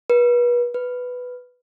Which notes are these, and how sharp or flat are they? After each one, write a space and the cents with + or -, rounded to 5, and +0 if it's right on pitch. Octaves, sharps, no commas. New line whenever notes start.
B4 -35
B4 +5